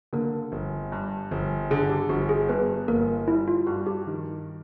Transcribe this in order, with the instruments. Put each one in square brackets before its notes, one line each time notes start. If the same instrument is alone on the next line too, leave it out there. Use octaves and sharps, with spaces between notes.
[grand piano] D3 [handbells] A#3 A#4
[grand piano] G1
G2
G1
[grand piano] D3 [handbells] G#4
[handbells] G4
[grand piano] G1 [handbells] F#4
[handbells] G#4
[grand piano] G2 [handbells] B3 B4
[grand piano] G1 [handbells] A#3 A#4
[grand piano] G3 [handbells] E4
[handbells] F4
[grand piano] G2 [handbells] F#4
[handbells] G4
[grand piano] D#3